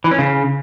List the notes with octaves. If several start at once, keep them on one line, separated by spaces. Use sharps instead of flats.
E3
C#4
C#3